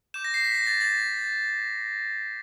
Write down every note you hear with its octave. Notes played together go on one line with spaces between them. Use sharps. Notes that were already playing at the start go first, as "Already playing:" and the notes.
D6 G6 E7
A#6
C7
B6
A#6
A6
A6